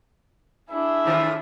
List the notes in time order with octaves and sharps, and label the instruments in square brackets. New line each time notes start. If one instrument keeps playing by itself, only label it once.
[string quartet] D4 E4 G#4 [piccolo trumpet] E5
[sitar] A2 D#3 F4